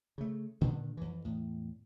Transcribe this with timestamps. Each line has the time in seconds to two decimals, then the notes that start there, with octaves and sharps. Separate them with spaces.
0.18 C#3 A3
0.61 G2 A#2 D3 D#3
0.97 F2 E3
1.25 E2 A2